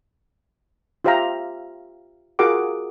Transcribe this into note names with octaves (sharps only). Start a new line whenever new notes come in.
F4 G4 C5 E5 F5 A#5
F4 F#4 G#4 A#4 F#5 D6